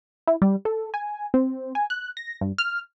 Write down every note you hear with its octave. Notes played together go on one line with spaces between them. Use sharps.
E4
G3
A4
G#5
C4
G#5
F#6
A#6
G2
F6